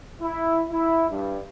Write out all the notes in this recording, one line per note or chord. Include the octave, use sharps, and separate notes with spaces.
E4
E4
G2